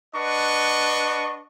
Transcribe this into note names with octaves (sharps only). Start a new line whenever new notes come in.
D4 B4 D#5 F#5 C#6